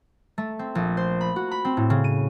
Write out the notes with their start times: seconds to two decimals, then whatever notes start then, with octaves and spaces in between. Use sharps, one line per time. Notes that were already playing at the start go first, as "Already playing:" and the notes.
0.38 A3
0.59 C4
0.75 A#1
0.97 C5
1.21 B5
1.36 F#4
1.51 B5
1.65 C4
1.77 A2
1.90 C#3
2.04 D#7